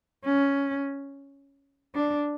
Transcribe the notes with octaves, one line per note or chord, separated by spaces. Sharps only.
C#4
D4